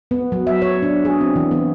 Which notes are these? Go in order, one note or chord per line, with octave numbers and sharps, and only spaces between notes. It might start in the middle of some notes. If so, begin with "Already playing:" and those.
B3
F#3
E5
C#5
D4
G#4
C4
E3
B3